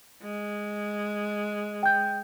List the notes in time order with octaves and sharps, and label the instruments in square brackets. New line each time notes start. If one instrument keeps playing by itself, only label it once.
[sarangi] G#3
[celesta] G5 G6